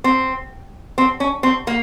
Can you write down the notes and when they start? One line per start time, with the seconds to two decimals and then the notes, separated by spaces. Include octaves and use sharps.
0.04 C4
0.98 C4
1.20 C#4
1.43 C4
1.67 A#3